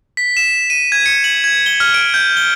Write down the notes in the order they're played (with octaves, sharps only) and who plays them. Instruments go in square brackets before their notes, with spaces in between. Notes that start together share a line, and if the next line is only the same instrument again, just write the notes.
[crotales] B6
E7
D#7
G#6
C#7
F#7
G#6
G7
F6
D7
G6
G7